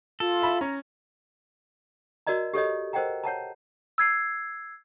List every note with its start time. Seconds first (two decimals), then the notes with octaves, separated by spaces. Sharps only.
0.20 F4 A4
0.42 E5 B5
0.61 C#4 A#5
2.27 F#4 A#4 D5 D#5 A#5
2.53 G4 A4 C#5 D#5
2.93 A#4 C5 D#5 F#5 G5 A#5
3.24 C#5 F#5 A5 A#5
3.98 E6 G#6 C7